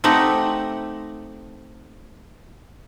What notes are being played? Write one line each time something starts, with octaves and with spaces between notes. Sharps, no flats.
A3 C4 D#4 G4 F#5